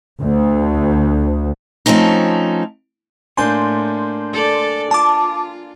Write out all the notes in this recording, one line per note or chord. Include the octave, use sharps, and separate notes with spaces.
D2
F3 A3 C4 C#4 D#4
A2 A#3 D4 G#5 C6 G6
A4 D5
F4 A5 D6